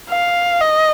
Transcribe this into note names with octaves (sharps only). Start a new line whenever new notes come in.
F5
D#5